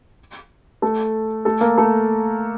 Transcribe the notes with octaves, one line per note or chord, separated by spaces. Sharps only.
A3 A4
A3 A4
A#3 A#4
A3 A4